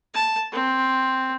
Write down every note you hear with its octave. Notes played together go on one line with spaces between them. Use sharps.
A5
C4